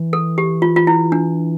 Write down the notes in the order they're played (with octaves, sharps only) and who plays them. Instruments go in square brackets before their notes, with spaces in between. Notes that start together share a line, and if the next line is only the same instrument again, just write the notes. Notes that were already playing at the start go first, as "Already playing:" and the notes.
Already playing: [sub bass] E3
[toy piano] A4
G4
F4
F4
E4
D4